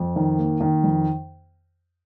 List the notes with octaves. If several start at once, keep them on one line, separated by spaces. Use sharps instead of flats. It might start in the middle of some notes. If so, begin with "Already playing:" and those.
Already playing: F2
D#3
A#3
D#3
F2